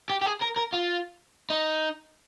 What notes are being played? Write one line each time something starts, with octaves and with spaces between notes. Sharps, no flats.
G4
G4
G#4
A#4
A#4
F4
D#4